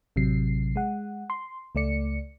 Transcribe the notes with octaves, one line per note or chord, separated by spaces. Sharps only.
A1 C3 F#3 C7
G#3 F#5
C6
C#2 A3 D5 C#7